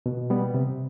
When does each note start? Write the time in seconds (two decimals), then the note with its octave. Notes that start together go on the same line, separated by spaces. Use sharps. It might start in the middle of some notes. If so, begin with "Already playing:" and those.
0.06 B2
0.30 G3 B3
0.54 C3